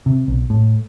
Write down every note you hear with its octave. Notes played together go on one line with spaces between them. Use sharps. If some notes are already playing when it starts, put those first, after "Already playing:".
C3
B1
A2